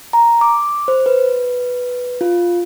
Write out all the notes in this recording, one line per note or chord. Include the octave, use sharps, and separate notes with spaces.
A#5
D6
C5
B4
F4